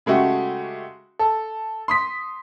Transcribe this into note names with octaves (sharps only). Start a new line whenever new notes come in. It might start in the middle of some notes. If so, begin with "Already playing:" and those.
C#3 G#3 A3 F#4 G4
A4
C6 D#6 B6